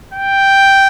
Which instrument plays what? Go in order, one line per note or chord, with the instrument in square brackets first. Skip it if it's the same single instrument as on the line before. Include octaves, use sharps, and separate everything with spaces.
[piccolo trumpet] G5